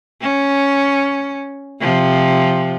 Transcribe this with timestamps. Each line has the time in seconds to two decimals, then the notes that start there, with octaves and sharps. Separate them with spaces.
0.21 C#4
1.80 C3 F3